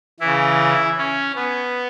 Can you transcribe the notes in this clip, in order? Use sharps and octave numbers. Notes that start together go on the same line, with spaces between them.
C#3 E3 E4
C#4
B3